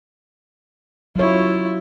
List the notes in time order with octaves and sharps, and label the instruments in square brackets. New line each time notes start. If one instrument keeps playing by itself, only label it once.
[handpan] F#3 C#5 [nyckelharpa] E4 F4